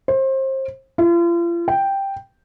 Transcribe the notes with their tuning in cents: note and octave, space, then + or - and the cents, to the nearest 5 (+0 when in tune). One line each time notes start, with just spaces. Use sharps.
C5 +30
F4 -40
G5 +0